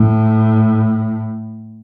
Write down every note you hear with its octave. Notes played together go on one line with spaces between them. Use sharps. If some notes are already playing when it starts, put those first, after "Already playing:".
Already playing: A2